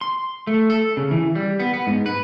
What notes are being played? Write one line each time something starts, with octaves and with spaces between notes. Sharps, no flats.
C6
A3
A4
C#3
E3
G3
B3
B3
G#2
B4